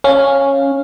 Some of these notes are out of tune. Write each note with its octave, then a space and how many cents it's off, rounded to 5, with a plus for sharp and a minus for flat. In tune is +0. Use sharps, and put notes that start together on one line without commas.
C#4 -5 F5 +0